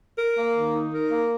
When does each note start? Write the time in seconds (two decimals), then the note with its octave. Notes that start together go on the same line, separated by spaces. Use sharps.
0.18 A#4
0.37 A#3
0.55 D#3
0.74 D#4
0.93 A#4
1.11 A#3